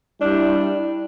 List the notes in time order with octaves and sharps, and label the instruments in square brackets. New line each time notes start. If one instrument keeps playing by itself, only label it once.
[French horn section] G3 E4 [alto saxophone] D4